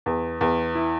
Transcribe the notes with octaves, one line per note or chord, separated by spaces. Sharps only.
E2
E2
E4